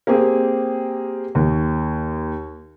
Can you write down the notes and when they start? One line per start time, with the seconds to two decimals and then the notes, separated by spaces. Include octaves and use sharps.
0.07 A#3 C4 G4 G#4
1.35 D#2